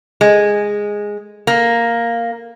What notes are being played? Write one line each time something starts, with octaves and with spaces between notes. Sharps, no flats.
G#3
A#3